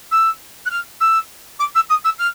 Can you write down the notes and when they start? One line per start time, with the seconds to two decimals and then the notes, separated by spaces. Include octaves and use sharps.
0.11 E6
0.65 F#6
0.70 F6
1.00 E6
1.59 D6
1.75 E6
1.89 D#6
2.04 E6
2.18 F6